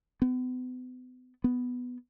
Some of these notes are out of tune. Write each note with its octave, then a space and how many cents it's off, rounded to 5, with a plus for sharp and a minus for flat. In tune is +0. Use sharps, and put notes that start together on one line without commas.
B3 +40
B3 +5